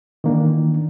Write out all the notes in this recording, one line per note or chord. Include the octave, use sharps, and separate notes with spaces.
D#3 E3 A#3 D4